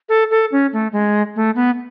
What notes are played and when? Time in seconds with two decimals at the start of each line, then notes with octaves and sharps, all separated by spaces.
0.09 A4
0.31 A4
0.52 C#4
0.73 A3
0.93 G#3
1.36 A3
1.56 B3